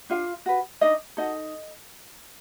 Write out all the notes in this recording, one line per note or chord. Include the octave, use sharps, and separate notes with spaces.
D4 F4 F5
F#4 B4
D4 D#4 D#5
D#4 F#4 A4 D#5